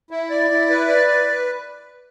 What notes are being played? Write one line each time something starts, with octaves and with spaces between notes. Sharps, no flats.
E4
D5
E4
B4
D5
B4